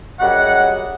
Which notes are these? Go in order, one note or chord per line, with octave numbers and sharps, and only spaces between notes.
F#2 G3 G#4 D#5 F#5